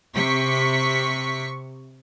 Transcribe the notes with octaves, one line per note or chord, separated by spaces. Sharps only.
C3 C#6 B6